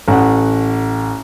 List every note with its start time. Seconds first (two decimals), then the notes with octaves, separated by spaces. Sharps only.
0.08 A1 F#5